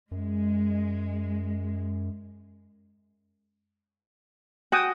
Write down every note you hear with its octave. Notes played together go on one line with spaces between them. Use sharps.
F#2 G#3
F#4 G5 G#5 D#6